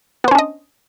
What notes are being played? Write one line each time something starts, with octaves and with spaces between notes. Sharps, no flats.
B3 C#4 D4 C5 D#5